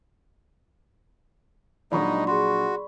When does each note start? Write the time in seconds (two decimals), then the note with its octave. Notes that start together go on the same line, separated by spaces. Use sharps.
1.92 A#1 F#3 G#3 D4 D#4 D5 B5 C#6
2.27 F#4 G#4 C6